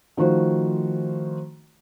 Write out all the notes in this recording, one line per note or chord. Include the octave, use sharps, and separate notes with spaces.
D#3 F3 A3 F#4 C5